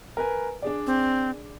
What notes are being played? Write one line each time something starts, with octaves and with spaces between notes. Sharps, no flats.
A#4 B4 G#5
D4 G#4 D5
C4